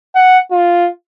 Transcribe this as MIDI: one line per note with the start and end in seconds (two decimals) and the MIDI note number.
0.15 0.39 78
0.51 0.89 65